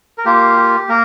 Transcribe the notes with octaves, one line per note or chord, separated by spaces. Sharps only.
A#4
A#3 F4 G4
G4
A#3 A#4